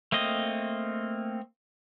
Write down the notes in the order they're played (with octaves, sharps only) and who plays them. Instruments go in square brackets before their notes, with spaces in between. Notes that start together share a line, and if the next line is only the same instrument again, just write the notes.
[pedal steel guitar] A3 A#3 C4 D#5